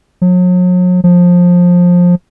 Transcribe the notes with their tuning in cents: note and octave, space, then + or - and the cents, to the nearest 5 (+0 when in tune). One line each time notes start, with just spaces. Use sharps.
F#3 -40
F3 +20